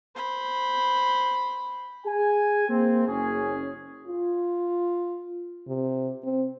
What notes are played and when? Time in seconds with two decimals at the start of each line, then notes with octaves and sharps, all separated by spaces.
0.16 C5 B5
2.06 G#4 G#5
2.70 A#3 C4
3.07 F#1 C#4 G#4
4.07 F4
5.68 C3
6.24 C4